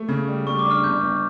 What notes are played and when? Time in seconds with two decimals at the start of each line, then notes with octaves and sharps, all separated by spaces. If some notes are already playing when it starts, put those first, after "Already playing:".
Already playing: A3
0.08 C#3
0.27 G3
0.46 G3 C#6
0.59 D6
0.65 D4
0.71 F6
0.84 G1 G6
1.02 G1